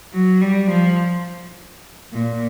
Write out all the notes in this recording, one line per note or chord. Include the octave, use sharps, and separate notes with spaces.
F#3
G3
F3
A#2